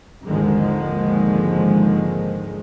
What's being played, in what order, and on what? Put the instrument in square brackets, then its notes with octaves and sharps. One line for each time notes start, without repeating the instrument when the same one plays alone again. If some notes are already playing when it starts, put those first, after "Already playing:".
[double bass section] G#1 D#2 D3 D#3 F3 G#3